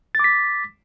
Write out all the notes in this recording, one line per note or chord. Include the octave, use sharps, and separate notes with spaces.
D6 A6 B6